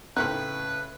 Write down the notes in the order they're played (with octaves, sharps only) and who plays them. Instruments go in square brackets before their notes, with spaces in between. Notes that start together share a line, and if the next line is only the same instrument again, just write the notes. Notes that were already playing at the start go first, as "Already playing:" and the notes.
[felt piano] A2 C#3 [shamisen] C4 C#4 D#4 [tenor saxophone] B4 [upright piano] F#6